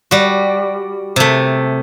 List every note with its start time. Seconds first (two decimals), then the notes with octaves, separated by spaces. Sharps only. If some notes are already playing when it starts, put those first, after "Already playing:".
0.11 G3 F#4
1.16 C3 A3